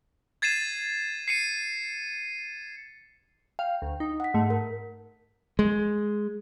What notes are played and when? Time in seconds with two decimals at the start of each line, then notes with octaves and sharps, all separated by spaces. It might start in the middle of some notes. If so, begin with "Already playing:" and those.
0.42 G#6 A6 C7 D#7 E7
1.28 C7 C#7 D#7
3.59 F5 G5
3.82 D2
4.00 D#4
4.20 F#5 B6
4.34 G#2 A3
4.50 A#4
5.59 G#3